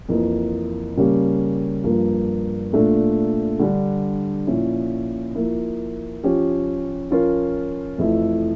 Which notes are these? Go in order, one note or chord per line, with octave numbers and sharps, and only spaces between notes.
F2 E3 A#3
C#3 G3 A#3 C#4 G4
G2 F3 A#3
A#2 A3 D4 A4
D3 G3 D4
A#2 F3 C#4 E4
F3 A#3 E4
F3 C#4 G4
F3 C#4 F4 A#4
F2 E3 A3 E4